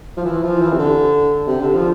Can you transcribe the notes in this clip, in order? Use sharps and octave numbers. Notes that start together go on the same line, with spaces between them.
F3
E3
F3
E3
C3
D3
C3
D3
F3